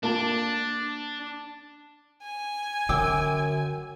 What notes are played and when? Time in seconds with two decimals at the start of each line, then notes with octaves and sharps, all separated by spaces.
0.03 A#3 D4 A5
2.23 G#5
2.89 F#2 D3 G5 D6 E6